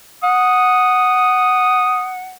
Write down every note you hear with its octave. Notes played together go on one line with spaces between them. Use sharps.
F#5 D#6